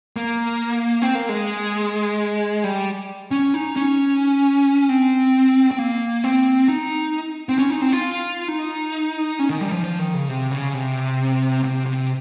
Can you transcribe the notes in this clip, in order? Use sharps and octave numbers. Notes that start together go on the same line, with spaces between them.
A#3
C4
A#3
G#3
G3
C#4
D#4
C#4
C4
C4
A#3
C4
D#4
C4
C#4
D#4
C4
F4
D#4
C#4
D#3
G3
F3
F3
D#3
C#3
C3
C#3
C3
C3
C3